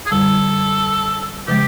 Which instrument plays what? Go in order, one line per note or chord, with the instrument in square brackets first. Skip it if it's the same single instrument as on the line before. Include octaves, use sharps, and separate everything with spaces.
[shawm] G#4
[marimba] F#2 D3 G3 [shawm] A4
[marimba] C#3 F3 G#3 [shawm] G4